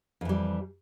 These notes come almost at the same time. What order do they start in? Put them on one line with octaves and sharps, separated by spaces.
F2 E3 G3